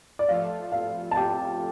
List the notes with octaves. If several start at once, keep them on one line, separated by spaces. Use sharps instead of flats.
D5
F3 A3 F4 A4 F5
F5
A5
G4 G5